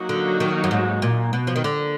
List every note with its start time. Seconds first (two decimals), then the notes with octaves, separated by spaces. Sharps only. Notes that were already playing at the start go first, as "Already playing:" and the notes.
Already playing: F#3 A#3 D#4 F#4
0.09 D3
0.40 D#3
0.64 F#2
0.71 G#2
1.02 A#2
1.33 B2
1.47 F3
1.56 D#3
1.64 D3 A#3 F4 A#4